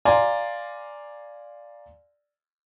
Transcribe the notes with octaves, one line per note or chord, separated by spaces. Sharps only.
D5 F5 G#5 A#5 C6